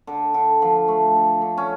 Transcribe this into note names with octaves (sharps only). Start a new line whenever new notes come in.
D3
D3
F3
A3
D3
D3
C#4